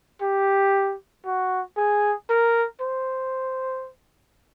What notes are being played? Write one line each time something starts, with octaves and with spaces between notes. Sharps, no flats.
G4
F#4
G#4
A#4
C5